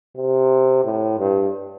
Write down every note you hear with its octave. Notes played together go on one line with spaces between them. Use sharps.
C3
A2
G2